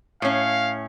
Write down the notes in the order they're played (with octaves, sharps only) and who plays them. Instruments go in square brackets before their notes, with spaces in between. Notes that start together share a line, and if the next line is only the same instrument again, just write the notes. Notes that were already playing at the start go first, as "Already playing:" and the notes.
[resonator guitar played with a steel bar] A2 C#4 [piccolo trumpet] F5